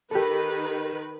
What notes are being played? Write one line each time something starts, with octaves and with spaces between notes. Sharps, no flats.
D#3 G4 A4 B4